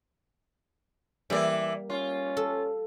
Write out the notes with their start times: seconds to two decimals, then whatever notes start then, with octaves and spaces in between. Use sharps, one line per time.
1.30 E3 G3 A#3 E4 D5
1.90 C#4 F4
2.37 A4